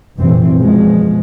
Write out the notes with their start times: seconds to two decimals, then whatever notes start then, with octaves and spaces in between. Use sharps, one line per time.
0.18 F1 F#2 A#2 E3 C4
0.58 B2 F3 G#3